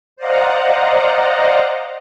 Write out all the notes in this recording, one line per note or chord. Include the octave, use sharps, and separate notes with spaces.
C5 D5 D#5 F5 F#5 A#5